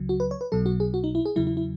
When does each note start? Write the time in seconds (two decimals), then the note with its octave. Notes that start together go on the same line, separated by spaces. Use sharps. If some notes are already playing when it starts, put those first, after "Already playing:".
Already playing: C#2 C#3 F#3
0.09 F#4
0.20 B4
0.31 C#5
0.41 B4
0.52 B1 B2 F#3 A4
0.66 F#4
0.80 G#4
0.94 F#4
1.04 D#4
1.15 E4
1.25 G#4
1.36 E2 C#3 F#3 E4
1.47 E4
1.57 E4